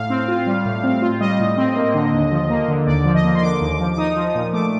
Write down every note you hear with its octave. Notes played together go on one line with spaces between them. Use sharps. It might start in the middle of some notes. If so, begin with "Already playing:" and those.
Already playing: A2 F5
C4
F4
G3
A2
C4
F4
G3 D#5
A2
C4
A#3
D3
D#2
F3
A#3
D3
D#2 D5
F3
D#5
A#3
C6
D3 D6
D#2
F3
D6
D#4 D#6
F3
A#2
A3 D6